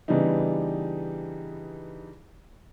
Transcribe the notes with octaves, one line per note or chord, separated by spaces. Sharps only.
C#3 E3 G3 B3 D4 D#4